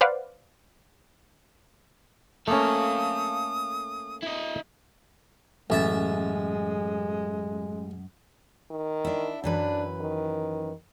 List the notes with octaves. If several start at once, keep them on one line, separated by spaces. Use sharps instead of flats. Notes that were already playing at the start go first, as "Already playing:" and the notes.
B4 C5 D5 F5 F#5
A3 A#3 C#4 A4 F5 D#6
E4 D#5
A1 F#2 G#3 E5 A5
D#3
D4 E4
F#2 E3 D4 B4
D#3